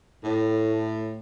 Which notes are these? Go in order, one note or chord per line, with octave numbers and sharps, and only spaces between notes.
A2